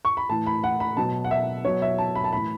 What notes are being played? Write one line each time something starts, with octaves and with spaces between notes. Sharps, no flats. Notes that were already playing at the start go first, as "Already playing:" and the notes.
C#6
B5
A2 E3 A5
B5
F#5
B5
B2 F#3 A5
F#5
E5
B2 F#3 C#5
E5
A5
B5
A5
A2 E3 B5